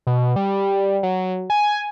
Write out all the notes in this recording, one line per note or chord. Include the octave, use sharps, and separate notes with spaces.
B2
G3
F#3
G#5